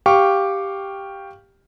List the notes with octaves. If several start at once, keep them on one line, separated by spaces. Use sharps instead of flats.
G4 F5 G5 C#6